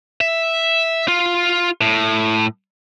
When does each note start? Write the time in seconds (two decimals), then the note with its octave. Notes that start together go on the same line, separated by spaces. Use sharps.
0.21 E5
1.08 F4
1.81 A2